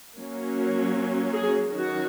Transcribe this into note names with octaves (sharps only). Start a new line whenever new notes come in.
F#3 A#3 C#4
G#4
D#3 F#3 C#4 F#4